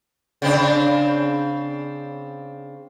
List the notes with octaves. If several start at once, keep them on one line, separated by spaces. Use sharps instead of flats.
C#3 C4 D4